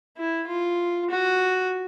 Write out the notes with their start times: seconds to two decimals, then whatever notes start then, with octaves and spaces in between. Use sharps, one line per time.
0.17 E4
0.48 F4
1.10 F#4